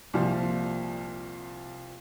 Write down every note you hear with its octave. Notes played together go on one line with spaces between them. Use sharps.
C2 A#2 F3